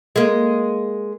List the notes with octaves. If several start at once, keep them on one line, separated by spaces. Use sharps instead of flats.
G#3 A#3